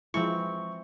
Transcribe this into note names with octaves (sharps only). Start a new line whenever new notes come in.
E3 F3 G#3 C4 E4 C#6